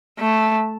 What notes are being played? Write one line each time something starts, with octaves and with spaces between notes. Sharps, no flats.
A3